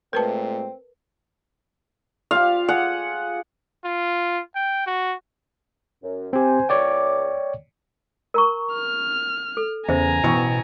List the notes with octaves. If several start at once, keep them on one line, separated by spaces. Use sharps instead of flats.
A#2 G#3 A3 C4 A#4 B4 A5
F4 G4 F5
G#4 F#5
F4
G5
F#4
F#2
C4 G4 C5 G#5
C#2 C#5 D5 G5 D6
A#4 A#5 C#6
F6
A4
E2 C#3 C5 E5 G#5 A#5
A1 B2 C#6